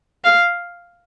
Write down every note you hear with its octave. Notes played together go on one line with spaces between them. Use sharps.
F5